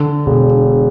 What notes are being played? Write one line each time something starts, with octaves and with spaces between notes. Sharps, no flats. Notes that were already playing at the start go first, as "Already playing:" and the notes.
Already playing: D3
E1